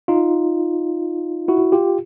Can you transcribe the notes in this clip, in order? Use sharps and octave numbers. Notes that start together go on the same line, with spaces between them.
D#4 F4
E4 F#4
F4 G4